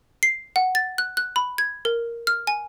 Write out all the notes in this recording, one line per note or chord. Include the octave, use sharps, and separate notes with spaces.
C7
F#5
A6
F#6
F#6
B5
G#6
A#4
F6
G#5